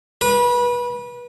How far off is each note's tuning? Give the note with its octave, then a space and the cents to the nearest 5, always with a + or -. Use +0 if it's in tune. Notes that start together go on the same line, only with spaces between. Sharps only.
B4 -25